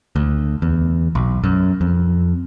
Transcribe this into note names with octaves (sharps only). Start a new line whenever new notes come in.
D2
E2
B1
F#2
F2